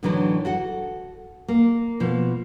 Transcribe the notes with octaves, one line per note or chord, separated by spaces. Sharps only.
A2 D3 E3 F#3 D4 D#4
F#4 A4 F#5
A#3
B2 F3